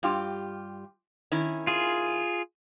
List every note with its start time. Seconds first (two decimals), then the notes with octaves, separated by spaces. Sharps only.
0.03 G2 F4 G4
1.32 D#3 C#4 E4
1.67 F4 G#4